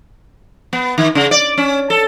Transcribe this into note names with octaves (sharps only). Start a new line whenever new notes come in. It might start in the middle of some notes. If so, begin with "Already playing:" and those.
B3
D#3
C#3
D5
C#4
A4